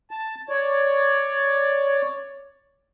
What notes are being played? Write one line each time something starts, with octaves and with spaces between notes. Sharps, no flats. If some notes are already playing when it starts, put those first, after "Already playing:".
A5
C#5 D5